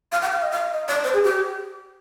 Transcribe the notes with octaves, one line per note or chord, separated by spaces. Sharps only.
F5
G5
F5
D#5
F5
D#5
D5
C5
G#4
G4